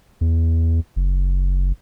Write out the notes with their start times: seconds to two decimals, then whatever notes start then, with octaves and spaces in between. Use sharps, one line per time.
0.21 E2
0.96 F#1